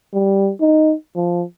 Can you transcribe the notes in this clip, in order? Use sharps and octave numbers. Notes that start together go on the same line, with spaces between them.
G3
D#4
F3